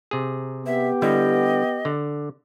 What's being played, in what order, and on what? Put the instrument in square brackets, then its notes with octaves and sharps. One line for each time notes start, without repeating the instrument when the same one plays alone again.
[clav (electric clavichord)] C3 G#4
[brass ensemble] B3 G4 [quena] E5
[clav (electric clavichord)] D3 G3 E4 [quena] D#5
[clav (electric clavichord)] D3